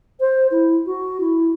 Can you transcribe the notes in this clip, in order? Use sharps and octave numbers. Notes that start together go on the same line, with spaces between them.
C5
E4
F#4
E4